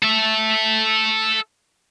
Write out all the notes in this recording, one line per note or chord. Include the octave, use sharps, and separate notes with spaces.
A4 E5